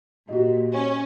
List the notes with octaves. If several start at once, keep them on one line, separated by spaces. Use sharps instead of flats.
A#2 F#4 G4 D#5
C#4